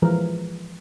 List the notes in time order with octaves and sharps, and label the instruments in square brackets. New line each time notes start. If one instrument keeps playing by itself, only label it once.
[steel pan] E3 F3 G#3 A#4